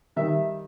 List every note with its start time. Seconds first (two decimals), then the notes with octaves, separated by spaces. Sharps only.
0.16 D#3 G3 E5